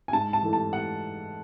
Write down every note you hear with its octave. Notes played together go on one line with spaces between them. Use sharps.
G#5
G#2 A5
A5
E3 A3
A5
F#5